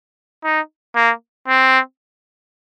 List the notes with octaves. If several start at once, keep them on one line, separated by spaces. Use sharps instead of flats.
D#4
A#3
C4